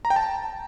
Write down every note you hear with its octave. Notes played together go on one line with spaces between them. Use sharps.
A#5
G5
A5